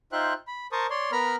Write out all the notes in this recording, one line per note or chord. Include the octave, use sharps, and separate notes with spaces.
D#4 F4 C5 E5 G5 F#6
B5
A#4 C5 A5 C#6 D#6
C#5 D5 C6
B3 A#4 A#5 B5 F6